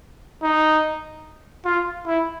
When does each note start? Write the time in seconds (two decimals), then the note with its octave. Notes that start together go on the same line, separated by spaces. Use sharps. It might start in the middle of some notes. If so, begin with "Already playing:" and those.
0.43 D#4
1.65 F4
2.06 E4